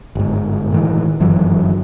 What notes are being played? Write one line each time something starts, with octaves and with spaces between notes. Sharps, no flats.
G1 G#2
A2 D#3 E3
G1 F#2 E3 F#3